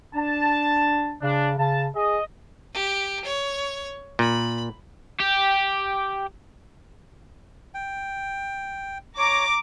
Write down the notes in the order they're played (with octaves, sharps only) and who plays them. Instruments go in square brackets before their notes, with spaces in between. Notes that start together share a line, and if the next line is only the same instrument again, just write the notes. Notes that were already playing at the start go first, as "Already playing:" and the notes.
[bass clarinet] D4 [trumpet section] A5
[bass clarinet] C#3 [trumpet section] D4
[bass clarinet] C#3 [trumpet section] A5
[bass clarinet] G#4 [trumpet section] D#5
[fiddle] G4
C#5
[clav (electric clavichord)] A#2 [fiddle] B5
[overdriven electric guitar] G4
[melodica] G5
[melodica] C#5 [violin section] A#5 D6